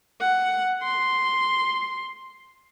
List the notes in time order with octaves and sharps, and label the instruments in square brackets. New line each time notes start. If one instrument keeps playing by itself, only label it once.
[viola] F#5
C6